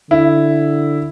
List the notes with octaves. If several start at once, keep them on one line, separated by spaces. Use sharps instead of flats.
D3 E4